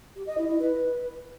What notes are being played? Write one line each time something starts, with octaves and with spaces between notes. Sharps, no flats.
G4
D#5
E4
E4
B4